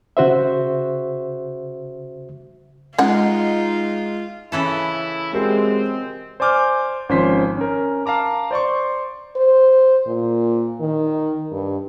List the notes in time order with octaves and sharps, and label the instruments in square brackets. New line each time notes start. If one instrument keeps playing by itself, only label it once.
[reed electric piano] C#3 F#4 C5 E5
[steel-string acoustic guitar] G#3 [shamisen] C#4 F#5 [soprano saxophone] D#4 [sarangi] F4
[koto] C#3 E3 A4 [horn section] E4
[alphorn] G#3 [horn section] C4 [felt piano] F#4 G4 A#4
[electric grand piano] C5 D5 G#5 D6 F6 G6
G#1 F3 C#4 C5 C6 B6
C#4 A#4
F5 A5 A#5 D6
C5 D5 C6 C#6
[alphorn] C5
A#2
D#3
G2